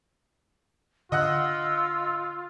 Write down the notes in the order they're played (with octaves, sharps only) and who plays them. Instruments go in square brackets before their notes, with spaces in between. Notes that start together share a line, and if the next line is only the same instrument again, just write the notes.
[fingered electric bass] D3 [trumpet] F4 [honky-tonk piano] D#5 F#5 F#6 [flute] E6